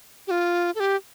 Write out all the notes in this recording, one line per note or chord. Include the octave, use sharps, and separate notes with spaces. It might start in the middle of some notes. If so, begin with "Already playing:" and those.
G4
F4
A4
G4